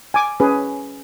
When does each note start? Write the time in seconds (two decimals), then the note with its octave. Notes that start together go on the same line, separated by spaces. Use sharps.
0.14 G#5 D6
0.40 C#4 G#4 B4